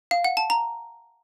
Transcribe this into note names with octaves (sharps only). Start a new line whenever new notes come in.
F5
F#5
A5
A#5